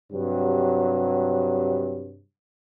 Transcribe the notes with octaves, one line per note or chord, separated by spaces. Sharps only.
G2 C3 F#3